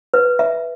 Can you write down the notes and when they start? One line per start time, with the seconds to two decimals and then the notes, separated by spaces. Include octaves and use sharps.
0.14 B4
0.39 E5